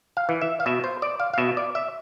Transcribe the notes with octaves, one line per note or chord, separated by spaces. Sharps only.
F5
E3
E5
F5
B2 E5
C5
D5
F5
F5
B2 E5
D5
E5